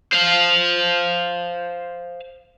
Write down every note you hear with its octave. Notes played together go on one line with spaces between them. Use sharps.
C5 F5